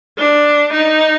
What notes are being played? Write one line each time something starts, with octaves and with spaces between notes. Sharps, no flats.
D4
D#4